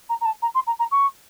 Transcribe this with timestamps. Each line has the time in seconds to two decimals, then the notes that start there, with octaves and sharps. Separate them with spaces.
0.09 A#5
0.21 A#5
0.25 A5
0.42 A#5
0.54 C6
0.67 A#5
0.79 A#5
0.91 C#6